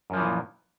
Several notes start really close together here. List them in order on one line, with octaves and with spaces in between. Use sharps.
F#2 F3 E3 A#2